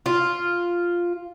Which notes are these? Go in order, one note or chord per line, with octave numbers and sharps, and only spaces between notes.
F4